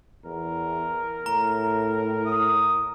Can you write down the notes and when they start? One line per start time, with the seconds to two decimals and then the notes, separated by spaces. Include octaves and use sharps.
0.25 E2 A#4
1.26 A2 A#5
2.26 D#6